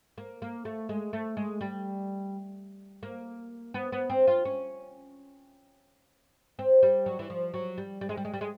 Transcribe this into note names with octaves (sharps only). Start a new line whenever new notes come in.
A#3
A#3
A3
G#3
A3
G#3
G3
A#3
B3
B3
C4
F4
C#4
C4
G3
F#3
E3
F3
F#3
G3
G3
G#3
G3
G#3
G3
G#3